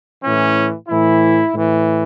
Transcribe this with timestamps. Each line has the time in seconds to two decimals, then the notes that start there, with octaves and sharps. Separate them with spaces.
0.23 A2 E3 C#4
0.89 A2 E3 E4
1.54 A2 E3